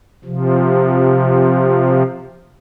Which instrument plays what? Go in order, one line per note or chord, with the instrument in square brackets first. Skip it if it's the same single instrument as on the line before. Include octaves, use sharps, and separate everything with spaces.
[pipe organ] C3 F3